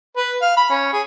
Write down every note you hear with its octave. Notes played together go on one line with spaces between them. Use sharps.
B4
F5
B5
C#4
G#4